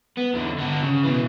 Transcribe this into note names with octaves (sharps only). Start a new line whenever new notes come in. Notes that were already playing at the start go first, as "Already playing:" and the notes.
B3
E2 D3
D3 B3
C#3
B2 E3